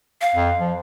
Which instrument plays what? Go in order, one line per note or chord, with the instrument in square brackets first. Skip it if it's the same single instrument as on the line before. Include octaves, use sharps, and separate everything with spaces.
[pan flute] F5
[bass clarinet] F2
F3